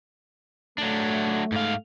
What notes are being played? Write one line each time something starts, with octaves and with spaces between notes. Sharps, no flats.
F#3 A3 D4
G#2 F5